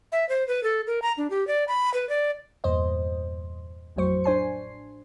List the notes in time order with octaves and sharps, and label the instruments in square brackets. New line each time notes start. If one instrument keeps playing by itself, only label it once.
[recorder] E5
C5
B4
A4
A#4
A#5
D4
G4
D5
B5
B4
D5
[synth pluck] E2 G2 A#2 C5 D#5
A1 F2 A2 F#3 C5 C#6
D4 C5 G#5 C7